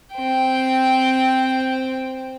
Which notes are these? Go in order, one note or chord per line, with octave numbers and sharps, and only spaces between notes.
C4 G5